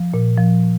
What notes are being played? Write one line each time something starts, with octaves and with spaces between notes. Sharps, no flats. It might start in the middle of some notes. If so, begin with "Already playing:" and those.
Already playing: F3
A#2
F3